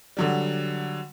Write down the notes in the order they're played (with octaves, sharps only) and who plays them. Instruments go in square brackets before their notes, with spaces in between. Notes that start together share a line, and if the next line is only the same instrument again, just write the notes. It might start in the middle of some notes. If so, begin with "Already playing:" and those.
[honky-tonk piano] D3 F#3 G3